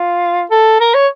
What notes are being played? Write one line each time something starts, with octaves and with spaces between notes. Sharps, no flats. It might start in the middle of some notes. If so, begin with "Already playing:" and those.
Already playing: F4
A4
A#4
C#5